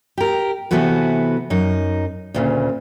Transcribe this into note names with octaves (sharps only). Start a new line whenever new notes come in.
G4 A#4
C3 E3 A3 B3 F#4 B4
F#2 D#4
D2 A#2 C#3